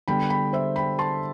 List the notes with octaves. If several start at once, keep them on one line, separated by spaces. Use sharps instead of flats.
D3 G3 B3 G5 B5
G5 B5
C5 E5
G5 B5
A5 C6